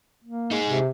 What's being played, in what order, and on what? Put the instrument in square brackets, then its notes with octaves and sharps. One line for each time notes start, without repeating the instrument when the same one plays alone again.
[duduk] A#3
[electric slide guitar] D#4 G#4
[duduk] C3